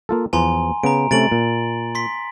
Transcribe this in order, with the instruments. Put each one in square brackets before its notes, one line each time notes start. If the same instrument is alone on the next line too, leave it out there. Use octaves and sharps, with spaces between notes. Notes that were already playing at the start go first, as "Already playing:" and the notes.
[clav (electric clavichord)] A#3 F4 A4
[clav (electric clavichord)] E2 F3 B4 [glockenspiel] G#5 A#5 C6
[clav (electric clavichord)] C#3 B3 [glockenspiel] A#5 D7
[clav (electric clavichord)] C3 A3 C#4 [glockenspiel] A6 D7 F#7
[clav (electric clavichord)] A#2
[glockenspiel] C6 B6